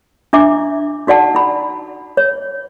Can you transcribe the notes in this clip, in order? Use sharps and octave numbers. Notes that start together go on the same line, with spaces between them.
D4 E4 E5 D6
D#4 F#4 D5 F#5 A5
E4 B5
C#5